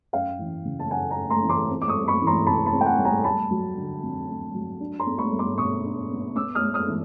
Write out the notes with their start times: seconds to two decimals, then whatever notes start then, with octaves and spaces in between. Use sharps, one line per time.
0.13 F#2 F5 G5
0.39 E3
0.65 C#3
0.79 A5
0.91 F#2 F#5 G#5
1.10 G#5 A#5
1.17 F#2
1.30 A#5 C6
1.43 E3
1.49 C6 D6
1.70 C4
1.82 D6
1.88 C#6 D#6
1.95 G3
2.08 B5 C#6
2.22 E3
2.27 A#5 C6
2.46 C3 A5 B5
2.66 A5 B5
2.72 C4
2.81 G5
2.86 F#5 G#5
2.98 G3
3.05 G#5 A#5
3.24 A3 A5 B5
3.51 F#3
3.77 D3
4.03 F2
4.28 A3
4.54 F#3
4.80 D4
4.99 A#5 C6
5.07 B3
5.19 B5 C#6
5.32 G3
5.39 C6 D6
5.58 B2 C#6 D#6
5.84 D4
6.10 B3
6.36 B3 D6 E6
6.55 D#6 F6
6.62 G#3
6.74 D#6 F6
6.87 E3